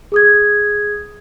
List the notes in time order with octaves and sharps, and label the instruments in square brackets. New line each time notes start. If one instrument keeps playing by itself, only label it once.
[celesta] G#4 D#6 G#6